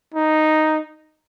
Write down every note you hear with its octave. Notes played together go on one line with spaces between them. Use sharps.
D#4